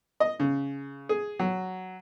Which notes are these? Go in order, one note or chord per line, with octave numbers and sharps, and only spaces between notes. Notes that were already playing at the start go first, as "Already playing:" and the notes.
D#5
C#3
G#4
F#3